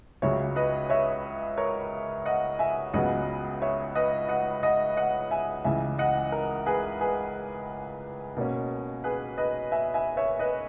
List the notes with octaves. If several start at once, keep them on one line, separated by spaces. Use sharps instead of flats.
C#2 C#3 F#3 C#5 E5
B4 D#5
C#5 E5
A#4 C#5
D#5 F#5
E5 G#5
C#2 C#3 F#3 B3 D#5 F#5
C#5 E5
B4 D#5
D#5 F#5
D#5 F#5
D#5 F#5
E5 G#5
C#2 C#3 E3 E5 G#5
D#5 F#5
A#4
G#4 B4
G#4 B4
B2 A#3 C#4
G#4 B4
B4 D#5
E5 G#5
E5 G#5
C#5 E5
B4 D#5